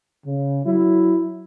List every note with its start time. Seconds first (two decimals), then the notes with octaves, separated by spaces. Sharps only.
0.24 C#3
0.64 F#3 E4